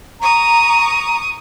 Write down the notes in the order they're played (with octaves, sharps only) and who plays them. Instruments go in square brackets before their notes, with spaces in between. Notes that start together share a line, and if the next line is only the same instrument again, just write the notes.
[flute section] A#5 [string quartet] C#6 D#6